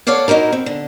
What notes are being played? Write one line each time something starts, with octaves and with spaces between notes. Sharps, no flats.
A4 C#5 D5 F5 F#5
D#4 E4 F#4 A#4
C4
D3